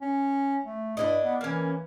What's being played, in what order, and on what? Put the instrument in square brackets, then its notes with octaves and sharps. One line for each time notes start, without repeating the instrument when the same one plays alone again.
[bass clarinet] C#4
A3
[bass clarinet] G2 [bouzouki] D4 E4 D#5
[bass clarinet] B3
[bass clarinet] E3 [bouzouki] A#3 C#4